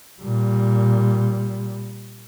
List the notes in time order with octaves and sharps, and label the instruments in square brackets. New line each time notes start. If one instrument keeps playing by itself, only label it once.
[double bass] A#2 G3